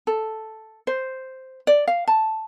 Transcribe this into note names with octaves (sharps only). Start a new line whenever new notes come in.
A4
C5
D5
F5
A5